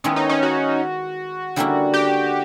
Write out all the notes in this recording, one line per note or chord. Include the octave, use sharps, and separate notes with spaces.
D#3 G#3 B3 C#4 E4
D#4
C#4
F#4
D3 G3 A#3 C#4 E4
G4